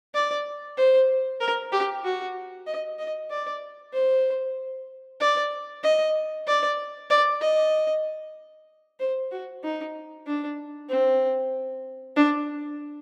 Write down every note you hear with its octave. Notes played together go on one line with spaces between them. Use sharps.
D5
C5
A#4
G4
F#4
D#5
D#5
D5
C5
D5
D#5
D5
D5
D#5
C5
F#4
D#4
D4
C4
D4